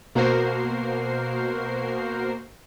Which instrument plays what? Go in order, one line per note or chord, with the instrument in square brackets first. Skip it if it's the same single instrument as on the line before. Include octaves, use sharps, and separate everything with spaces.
[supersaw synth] B2 A#3 F#4 A#4 C5 C7